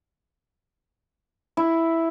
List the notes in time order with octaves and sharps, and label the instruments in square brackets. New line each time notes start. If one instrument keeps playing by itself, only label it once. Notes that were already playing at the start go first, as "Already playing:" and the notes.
[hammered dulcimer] E4